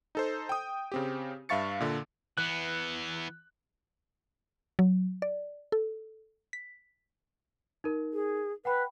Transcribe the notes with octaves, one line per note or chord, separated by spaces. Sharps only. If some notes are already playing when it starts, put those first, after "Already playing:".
D#4 A4 C5
G5 D#6
C#3 C4 G4
G2 E5 F5 C#6 A6 C#7
A#2 D3
E3 B3 F#6
F#3
D5
A4
B6
D#4 A#4
G#4
B4 F#5 G5 B5